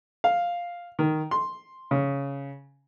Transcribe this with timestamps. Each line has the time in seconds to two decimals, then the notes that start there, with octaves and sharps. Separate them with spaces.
0.24 F5
0.99 D#3
1.31 C6
1.91 C#3